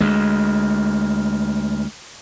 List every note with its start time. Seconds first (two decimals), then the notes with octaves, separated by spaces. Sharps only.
0.01 D2 G#3